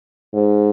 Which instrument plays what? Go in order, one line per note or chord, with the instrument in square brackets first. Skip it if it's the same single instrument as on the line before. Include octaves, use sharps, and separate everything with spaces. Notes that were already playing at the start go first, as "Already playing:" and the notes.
[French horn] G#2